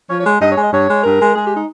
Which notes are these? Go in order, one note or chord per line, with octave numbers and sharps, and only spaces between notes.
F3 C#5
G#3 C#5
G2 D#5
G#3 C#5
D#5
G2 C#5
G#3
G2 A#4
G#3
G#3 G#4
G4
D#4